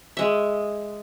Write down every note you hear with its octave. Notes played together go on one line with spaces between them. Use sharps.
G#3 E5